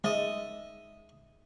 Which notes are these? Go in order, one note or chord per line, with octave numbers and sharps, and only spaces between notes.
G#3 D#5 E5